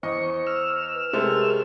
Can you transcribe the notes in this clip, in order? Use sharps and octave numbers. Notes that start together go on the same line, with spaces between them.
E2 C5 D#5 C#6
E6 F6
B4
C3 G#3 A3 A#4